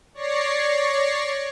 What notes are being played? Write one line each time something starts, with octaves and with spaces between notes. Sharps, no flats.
C#5 D5 C#6 A#6 C7